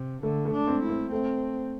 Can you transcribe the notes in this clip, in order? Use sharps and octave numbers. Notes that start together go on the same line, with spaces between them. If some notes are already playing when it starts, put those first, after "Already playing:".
Already playing: C3
D3 A3
A3
D4
C4
E4
C4
A3 C4